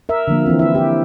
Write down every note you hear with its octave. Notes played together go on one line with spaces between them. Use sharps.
A#4 E5
D3 F3 A#3
E3 C4
E4 E5
E4 G4